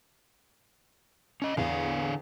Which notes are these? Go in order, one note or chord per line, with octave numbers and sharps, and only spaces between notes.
C#4 D#5
E2 D3 F5